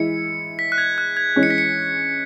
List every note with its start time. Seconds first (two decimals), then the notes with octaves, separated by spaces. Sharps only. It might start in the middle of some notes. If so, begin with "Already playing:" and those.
Already playing: E3 G#3 E4 C#7
0.59 B6
0.72 F#6
0.78 G#6
0.98 F#6
1.17 G#6
1.36 E3 G#3 C#4
1.43 C#7
1.50 B6
1.58 C#7